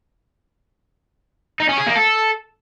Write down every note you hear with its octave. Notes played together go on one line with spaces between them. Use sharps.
D#4
C#4
G#4
A#3
A4